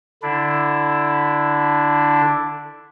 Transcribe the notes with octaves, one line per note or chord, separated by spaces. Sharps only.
D3 D4 E4